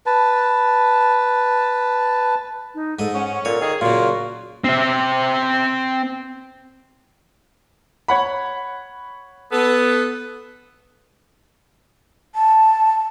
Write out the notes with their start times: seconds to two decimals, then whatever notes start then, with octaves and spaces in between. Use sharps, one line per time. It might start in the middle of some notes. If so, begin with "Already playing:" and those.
0.06 B4 A5
2.75 D#4
2.99 G#2 A4 D#5
3.14 C#4 F#5
3.45 A#2 A4 C#5
3.61 D#3 G#4
3.81 A#2 C#3 F#3 A#3 F4 F#4
4.64 C4 E5
8.08 C#5 F#5 B5
9.51 B3 A4
12.35 A5